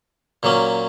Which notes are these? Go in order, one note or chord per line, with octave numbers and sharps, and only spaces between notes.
A#2 F#3 A#3 C#4